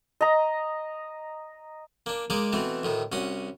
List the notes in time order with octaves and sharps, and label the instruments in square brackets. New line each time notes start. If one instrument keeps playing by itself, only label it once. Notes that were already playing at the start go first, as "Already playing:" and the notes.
[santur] D#5 A#5
[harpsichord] A#3 D4
G#3 A#3 D#4 D5
B2 E3 A3 C4
D2 A2 D#3
C2 C#4 F#4 D#6